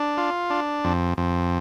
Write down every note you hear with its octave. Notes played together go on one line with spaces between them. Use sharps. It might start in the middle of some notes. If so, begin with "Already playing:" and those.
Already playing: D4
F4
D4
F2
F2